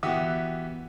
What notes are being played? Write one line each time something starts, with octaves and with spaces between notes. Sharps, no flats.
E3 B3 F#4 G4 E5 D#6